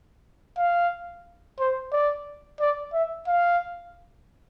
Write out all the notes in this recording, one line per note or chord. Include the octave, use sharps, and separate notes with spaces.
F5
C5
D5
D5
E5
F5